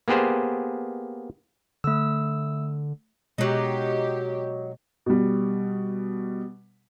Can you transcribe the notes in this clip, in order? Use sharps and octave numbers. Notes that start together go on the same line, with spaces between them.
A#3 B3 G4 G#4 C5
D3 A3 E6
B2 F#3 G#3 D#4 G4
B2 G3